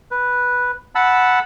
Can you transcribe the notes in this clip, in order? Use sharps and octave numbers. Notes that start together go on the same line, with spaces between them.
B4
F#5 A5 B5 E6